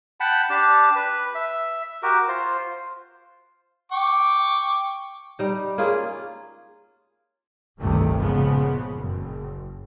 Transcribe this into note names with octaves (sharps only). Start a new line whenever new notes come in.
F#5 G5 A5 B5
D4 G4 A5
B4
E5
F#4 G4 A#4
F4 C5
G5 C#6 D6
G3 D#4
A#3 C#4 F4 G#4
G1 C#2 G2 C3 D#3 A3
A#2 C#3 F3 G#3 B3
F#1